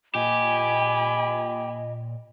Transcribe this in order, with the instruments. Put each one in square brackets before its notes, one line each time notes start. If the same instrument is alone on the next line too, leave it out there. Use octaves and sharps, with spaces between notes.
[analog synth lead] A#2 [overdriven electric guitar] G4 [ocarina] D#5 [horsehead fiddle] G#5 B5